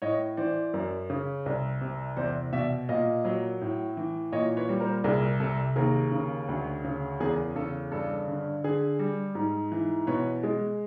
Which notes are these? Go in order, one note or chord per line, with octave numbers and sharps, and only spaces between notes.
A2 C#5 D#5
E3 C5 D5
F#2
C#3
C2
C3
E2 C5 D5
B2 D5 E5
A#2 D#5 F5
F#3
A2
E3
A#2 C#5 D#5
B4 C#5
G3
A#4 C5
C2 G#4 A#4
C3 A4
D#2 G#4 A#4
C#3
D2
C#3
E2 G#4 A#4
C#3 A4
G2 A4
D3
D3 G#4
G3
G#2
E3
B2 B4 C#5
G#3